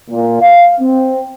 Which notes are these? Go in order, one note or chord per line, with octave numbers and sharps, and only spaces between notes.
A#2
F5
C4